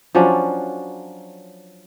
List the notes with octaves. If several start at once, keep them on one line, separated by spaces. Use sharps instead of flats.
F3 F#3 C#4 D4